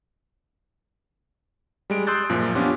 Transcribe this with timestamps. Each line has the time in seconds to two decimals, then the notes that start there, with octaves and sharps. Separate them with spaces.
1.90 G3 G#3 D7
2.07 C6 D#6 E6 F#6 G6 A6
2.29 F#2 A#2 F3
2.55 B3 C#4 D4 F4 G4